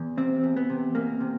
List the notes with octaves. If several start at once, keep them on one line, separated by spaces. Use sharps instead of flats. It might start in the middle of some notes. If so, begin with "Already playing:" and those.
Already playing: E2
C3 C4
E2
B3
C3
E2 A#3
C3